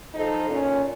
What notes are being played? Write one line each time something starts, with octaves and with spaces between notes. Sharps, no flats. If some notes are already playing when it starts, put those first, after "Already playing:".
F3 D#4 A4 C5
A#2 C#4